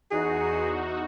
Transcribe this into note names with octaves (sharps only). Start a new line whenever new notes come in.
E2 D#4 F#4 G#4